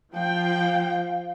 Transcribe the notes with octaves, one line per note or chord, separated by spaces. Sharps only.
F3 F5 G5